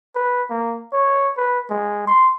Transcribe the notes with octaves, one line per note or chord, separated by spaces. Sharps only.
B4
A#3
C#5
B4
G#3
C6